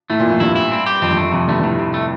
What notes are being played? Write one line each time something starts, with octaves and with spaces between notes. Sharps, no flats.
A2 A3
A#2
F2 A2
G2 E4
E4
C4
G4
F2 C4
G2
F2 A3
F2 C3
G2 A3
G2
A2 C3
C3
A3